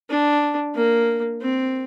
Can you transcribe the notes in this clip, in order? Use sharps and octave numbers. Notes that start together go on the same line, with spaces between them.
D4
A#3
C4